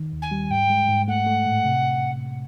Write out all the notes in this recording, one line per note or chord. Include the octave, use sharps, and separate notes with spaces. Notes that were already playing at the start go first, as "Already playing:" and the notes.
Already playing: D#3
D#2
G#5
G3
G#2 G5
G#3
G#2
A3 F#5
A3
A2
C3